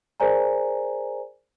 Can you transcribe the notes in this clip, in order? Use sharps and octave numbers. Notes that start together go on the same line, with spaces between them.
G#4 A#4 C5 D5 G#5 A#5